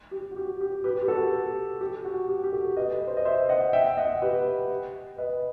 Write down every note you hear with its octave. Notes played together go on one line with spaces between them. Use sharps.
G4
F#4
G4
G4
G4 B4
G4
F#4 A4
G4
F#4
G4
G4
F#4 A4
B4 D#5
B4
C5
D#5
C5 E5
D#5 F#5
E5 G5
D#5 F#5
G4 B4
B4 D#5